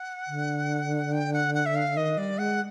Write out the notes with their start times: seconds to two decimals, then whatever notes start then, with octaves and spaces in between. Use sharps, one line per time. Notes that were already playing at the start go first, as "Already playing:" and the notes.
Already playing: F#5
0.27 D3
1.12 G5
1.33 F#5
1.54 F#5
1.66 E5
1.75 F5
1.96 D#3 D#5
2.17 G3 D5
2.38 G#3 F#5